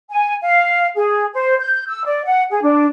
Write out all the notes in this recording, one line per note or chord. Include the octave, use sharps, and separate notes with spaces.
G#5
F5
G#4
C5
G6
E6
D5
F#5
G#4
D4